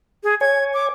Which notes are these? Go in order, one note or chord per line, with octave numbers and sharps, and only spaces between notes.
G#4
C#5 G#5 G#6
D6